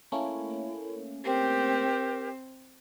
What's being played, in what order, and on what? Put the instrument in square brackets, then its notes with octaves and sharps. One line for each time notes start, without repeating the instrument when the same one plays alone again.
[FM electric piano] A3 A#3 C#4 [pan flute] E4
[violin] C4 [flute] G4 [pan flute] A#4